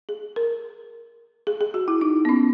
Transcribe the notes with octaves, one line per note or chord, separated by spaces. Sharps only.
G#4
A#4
G#4
G#4
F#4
E4
D#4
B3
C#4